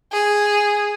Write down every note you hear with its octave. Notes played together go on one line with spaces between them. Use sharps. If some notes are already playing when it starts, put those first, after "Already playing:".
G#4